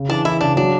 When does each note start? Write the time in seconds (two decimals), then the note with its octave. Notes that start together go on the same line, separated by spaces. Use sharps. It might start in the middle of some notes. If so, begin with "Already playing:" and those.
Already playing: C#3
0.09 E3 D4
0.25 E3 E4
0.41 C#3 D4
0.57 F#3 D4